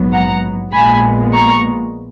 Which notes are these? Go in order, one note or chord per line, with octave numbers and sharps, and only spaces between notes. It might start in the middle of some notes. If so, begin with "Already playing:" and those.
Already playing: A#1 G#2 F#3 B3
F#5 A#5
A#1 A#2 G#3 B3 G#5 B5
A#5 C#6